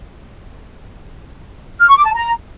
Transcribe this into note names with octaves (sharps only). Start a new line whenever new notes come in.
F6
C#6
D6
A5
A#5